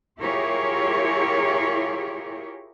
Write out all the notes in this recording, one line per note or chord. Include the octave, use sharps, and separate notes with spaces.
E4 F4 G4 G#4 A#4 C#5